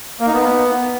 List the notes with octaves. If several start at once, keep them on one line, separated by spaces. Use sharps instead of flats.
A#3
D#4
B3